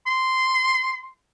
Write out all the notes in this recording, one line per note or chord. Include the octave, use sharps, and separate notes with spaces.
C6